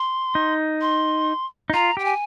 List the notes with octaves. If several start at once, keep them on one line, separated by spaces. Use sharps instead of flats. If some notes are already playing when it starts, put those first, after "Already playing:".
Already playing: C6
D#4
C6
D#4
F4 A#5
G4 G5
G#5